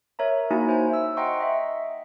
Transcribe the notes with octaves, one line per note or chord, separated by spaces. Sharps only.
A#4 C#5 E5 A#5
A#3 D#4 E4 F#4 G#5
C5 G#5
E5 E6
D#5 F#5 G5 A#5 C6 C#6
D#5 E5